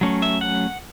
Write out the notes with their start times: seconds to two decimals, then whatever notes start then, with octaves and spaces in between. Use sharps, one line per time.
0.01 F#3 A3 C#4
0.22 E5
0.41 F#5